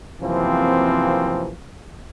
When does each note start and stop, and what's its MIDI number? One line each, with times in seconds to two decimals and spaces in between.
0.22 1.52 42
0.22 1.52 48
0.22 1.52 52
0.22 1.52 53
0.22 1.52 58
0.22 1.52 60